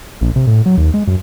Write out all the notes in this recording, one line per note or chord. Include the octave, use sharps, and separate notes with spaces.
A#1
C3
A2
F#3
D#2
G#3
F#2